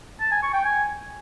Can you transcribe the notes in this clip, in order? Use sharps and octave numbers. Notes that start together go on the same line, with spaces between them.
A5
G#5
C#6
G5
G#5